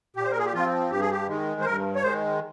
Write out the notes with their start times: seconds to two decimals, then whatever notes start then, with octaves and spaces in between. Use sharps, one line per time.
0.16 A#2 G4
0.24 C5
0.31 A#4
0.38 G#4
0.45 G4
0.54 F3 C4 F4
0.90 G2 G4
1.00 G#4
1.11 G4
1.28 D#3 G#3
1.61 C5
1.65 G2 A#4
1.96 C#5
2.02 D#3 G#3 C5